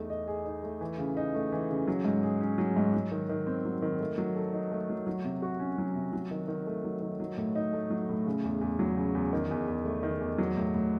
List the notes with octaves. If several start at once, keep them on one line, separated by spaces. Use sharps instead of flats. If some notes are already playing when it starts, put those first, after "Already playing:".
Already playing: E2 A3 D#4
D#5
G#4
D#4
A3
E3
C#3
D#4
A3
E3
C#3
F#3
G#2
G#4
C#4
F#3
G#2
F#3
D#3
D#3
C4
F#3
D#3
A3
F#3
A4
D#4
A3
F#3
F#3
C3
F#4
C#4
F#3
C3
F#3
D#3
D#3
A3
F#3
D#3
F#3
A2
D#4
A3
F#3
A2
C#3
E2
E2
F#3
C#3
E2
D#3
E2
E2
A3
D#3
E2
F#3
A2
A2